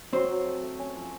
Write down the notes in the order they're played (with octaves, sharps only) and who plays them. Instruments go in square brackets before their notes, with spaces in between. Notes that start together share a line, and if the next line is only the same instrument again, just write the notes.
[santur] F#3 [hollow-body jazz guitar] C4 C5
[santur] F#3
A3
A3
C#4
F3